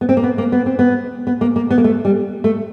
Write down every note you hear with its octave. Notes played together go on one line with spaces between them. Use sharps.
B3
C4
A#3
B3
A#3
B3
C4
B3
B3
A#3
A#3
B3
A#3
A3
G3
A3